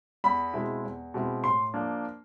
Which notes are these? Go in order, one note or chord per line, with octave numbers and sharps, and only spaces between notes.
E2 B5
B2 G#3 C4 E4
E2
B2 G#3 C4 E4
A2 C6
F3 A#3 D4